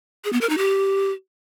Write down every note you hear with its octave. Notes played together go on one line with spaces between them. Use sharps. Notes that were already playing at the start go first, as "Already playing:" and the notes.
G#4
B3
A#4
D#4
G4